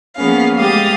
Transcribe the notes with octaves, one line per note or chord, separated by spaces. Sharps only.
F3 A#3 B3 C#4 G#4 F5
G#3 A3 G4 F5 D#6 A6